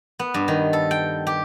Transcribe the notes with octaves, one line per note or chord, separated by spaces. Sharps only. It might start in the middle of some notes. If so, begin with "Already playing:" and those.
B3
G2
D#3
A4
G5
G4